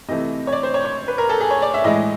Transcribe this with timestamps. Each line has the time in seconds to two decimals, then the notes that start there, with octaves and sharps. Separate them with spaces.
0.08 C3 E3 A3 D#5
0.47 C#5
0.52 D5
0.63 C5
0.74 C#5
0.85 C#5
1.08 B4
1.18 A#4
1.29 A4
1.40 G#4
1.51 C#5
1.62 D5
1.74 E5
1.84 A2 E3 G#3 D#5